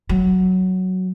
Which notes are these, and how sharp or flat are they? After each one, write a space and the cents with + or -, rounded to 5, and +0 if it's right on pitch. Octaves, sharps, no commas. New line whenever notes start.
F#3 +5